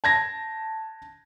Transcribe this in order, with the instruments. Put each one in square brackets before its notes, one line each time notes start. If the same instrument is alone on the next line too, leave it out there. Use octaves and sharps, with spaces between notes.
[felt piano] A5 G#6 A#6